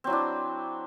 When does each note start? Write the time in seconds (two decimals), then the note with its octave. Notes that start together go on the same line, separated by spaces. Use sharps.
0.04 C4
0.07 F#3
0.10 E4
0.13 D4